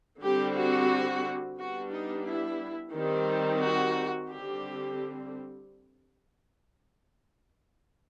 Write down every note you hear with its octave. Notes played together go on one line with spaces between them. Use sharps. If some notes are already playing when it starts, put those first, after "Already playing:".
D3 G3 C4 G4
F#4
G3 B3 D4 F#4
D#4
E4
D#3 G3 C4
F#4
D3 G3 C4 G4